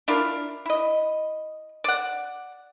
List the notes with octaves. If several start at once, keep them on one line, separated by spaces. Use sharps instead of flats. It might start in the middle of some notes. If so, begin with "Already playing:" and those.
D4 E4 F4 A#4
E4 D#5
D5 F#5